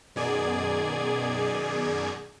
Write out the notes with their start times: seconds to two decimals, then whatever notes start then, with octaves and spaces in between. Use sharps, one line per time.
0.16 F#2 B2 D#3 G#4 D5 G#6